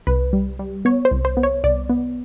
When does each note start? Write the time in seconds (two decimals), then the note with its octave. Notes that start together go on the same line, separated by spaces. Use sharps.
0.07 C2 B4
0.33 G3
0.59 G3
0.85 B3 C#5
1.05 C5
1.11 C2
1.25 C5
1.37 B3
1.43 C#5
1.64 C2 D5
1.90 B3